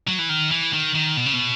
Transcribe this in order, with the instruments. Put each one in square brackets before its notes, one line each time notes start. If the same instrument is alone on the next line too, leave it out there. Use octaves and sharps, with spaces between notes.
[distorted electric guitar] F#3
E3
D#3
E3
D#3
D#3
B2
C#3
B2